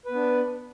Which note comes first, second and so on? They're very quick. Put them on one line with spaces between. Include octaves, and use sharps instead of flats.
B4 B3 D4